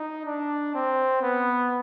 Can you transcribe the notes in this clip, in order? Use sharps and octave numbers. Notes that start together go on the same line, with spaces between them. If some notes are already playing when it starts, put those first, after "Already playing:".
Already playing: D#4
D4
C4
B3